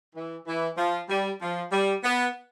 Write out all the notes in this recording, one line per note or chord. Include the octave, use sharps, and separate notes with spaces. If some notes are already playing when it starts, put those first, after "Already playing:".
E3
E3
F3
G3
F3
G3
B3